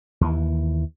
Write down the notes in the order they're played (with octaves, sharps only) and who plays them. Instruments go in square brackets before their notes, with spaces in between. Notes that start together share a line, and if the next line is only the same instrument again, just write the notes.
[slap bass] D#2 E3